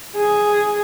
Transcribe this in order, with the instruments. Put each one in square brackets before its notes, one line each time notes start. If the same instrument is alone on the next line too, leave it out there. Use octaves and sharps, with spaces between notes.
[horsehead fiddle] G#4